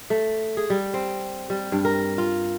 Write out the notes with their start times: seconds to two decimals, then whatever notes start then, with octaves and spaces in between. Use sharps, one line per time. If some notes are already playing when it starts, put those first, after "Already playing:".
0.10 A3
0.57 G#4
0.70 G3
0.94 C4
1.50 G3
1.72 G2
1.85 A#4
2.18 F4